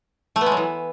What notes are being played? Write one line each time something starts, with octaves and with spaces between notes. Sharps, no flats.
A3
B3
G#3
F#3
E3